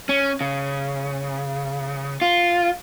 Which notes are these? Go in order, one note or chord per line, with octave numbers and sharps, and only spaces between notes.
C#4
C#3
F4